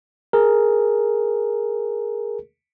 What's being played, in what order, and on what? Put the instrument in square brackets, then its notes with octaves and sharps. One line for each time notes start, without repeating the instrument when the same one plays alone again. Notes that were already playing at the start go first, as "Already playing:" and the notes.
[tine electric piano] G#4 A#4